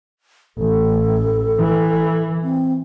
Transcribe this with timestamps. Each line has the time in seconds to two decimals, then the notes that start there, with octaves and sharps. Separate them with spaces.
0.58 A1 A4
1.58 E3
2.43 C4